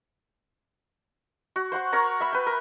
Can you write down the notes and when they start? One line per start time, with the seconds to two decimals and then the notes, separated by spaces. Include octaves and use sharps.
1.56 F#4
1.72 C5 F#5 C6 C#6
1.93 A#4 C#5 A#5
2.20 E5 B5
2.33 B4 G5
2.46 A#4